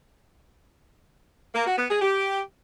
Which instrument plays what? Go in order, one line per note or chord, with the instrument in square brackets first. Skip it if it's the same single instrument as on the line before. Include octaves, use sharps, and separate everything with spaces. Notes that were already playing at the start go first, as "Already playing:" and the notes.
[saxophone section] A#3
F#4
B3
G#4
G4